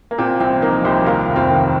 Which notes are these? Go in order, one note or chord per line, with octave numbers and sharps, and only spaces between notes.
A#3
A#2 C4
C2 C4
F3 A#3 D#4
C2 G4 C5
D#2 F4 A#4
F1
C4 F4
D#3